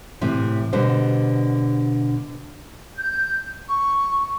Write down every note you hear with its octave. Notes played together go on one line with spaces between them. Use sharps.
A2 C3 E3
B2 D3 G3 C5
G6
C#6